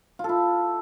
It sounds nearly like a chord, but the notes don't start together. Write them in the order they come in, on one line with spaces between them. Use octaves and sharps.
F4 A4 E4